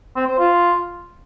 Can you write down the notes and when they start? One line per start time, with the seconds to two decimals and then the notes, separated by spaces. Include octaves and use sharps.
0.16 C4
0.27 C5
0.38 F4